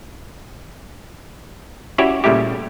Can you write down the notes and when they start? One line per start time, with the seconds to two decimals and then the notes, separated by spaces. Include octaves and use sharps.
1.98 C#4 E4 F#4 G4 C#5 D5
2.24 A#2 C#3 G3 A3 E4 G4